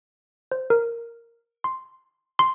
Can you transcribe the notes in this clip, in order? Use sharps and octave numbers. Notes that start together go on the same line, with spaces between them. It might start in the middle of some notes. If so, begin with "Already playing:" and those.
C5
A#4
C6
C6